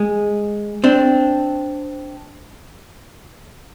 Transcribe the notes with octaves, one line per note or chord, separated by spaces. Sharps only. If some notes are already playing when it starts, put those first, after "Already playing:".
Already playing: G#3
C4 D4